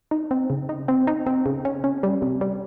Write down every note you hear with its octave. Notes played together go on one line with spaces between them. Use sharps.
D#4
C4
C#3
D#4
C4
D#4
C4
C#3
C#4
C#4
G3
C3
G3